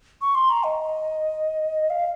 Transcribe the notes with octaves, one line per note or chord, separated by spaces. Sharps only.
C#6
C6
A#5
D#5
F5